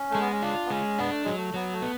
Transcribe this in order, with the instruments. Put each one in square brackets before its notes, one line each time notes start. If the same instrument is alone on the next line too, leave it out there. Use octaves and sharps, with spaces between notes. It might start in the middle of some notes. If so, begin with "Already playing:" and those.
Already playing: [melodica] C#4
[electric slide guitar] G#3 [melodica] A3
[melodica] B3
C#4
[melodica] D4 [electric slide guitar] F4
[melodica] B3
[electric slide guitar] G#3 [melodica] C#4
[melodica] B3 [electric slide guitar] D4
[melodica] A3
[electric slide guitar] F#3 [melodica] G#3
[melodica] A3
[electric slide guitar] F#3 [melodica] B3
[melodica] A3
[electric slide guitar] B3